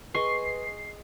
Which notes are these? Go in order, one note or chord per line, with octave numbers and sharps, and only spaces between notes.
G#4 B4 D#5 C6 C#6 C7